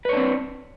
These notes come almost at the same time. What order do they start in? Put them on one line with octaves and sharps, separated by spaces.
B4 C#5 D4 C4